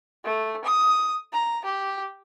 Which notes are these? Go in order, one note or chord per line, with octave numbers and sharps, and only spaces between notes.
A3
D#6
A#5
G4